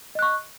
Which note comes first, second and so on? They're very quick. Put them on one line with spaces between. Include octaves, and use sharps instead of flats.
D#5 F#6 C#6